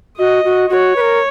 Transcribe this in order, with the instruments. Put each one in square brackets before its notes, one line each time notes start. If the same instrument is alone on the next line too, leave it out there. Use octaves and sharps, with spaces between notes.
[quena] F#4 [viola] D#5
[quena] F#4
[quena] F#4 [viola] C#5
[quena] B4
A#4